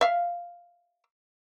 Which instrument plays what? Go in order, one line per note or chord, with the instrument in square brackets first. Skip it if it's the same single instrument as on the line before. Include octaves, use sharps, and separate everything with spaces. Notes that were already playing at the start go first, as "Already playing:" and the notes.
[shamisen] E5 F5